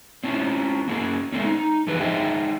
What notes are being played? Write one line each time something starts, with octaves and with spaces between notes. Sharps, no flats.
C4 C#4 E4
A#3 C#4 G#4
G#3 A3 C4 C#4
D#4
D3 E3 F3 G4 G#4 B4
D#4 G#4 E5 G5